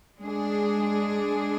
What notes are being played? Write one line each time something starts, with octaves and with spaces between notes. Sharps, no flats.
G#3 D4 G#4